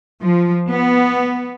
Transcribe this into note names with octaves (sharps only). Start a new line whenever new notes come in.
F3
B3